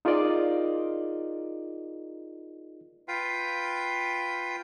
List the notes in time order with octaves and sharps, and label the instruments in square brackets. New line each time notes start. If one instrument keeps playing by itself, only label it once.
[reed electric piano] D#4 F4 G#4 A#4 D5 D#5
[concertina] F4 B4 F5 G5